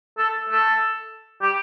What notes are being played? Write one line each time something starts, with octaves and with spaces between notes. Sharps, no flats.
A4
A4
G4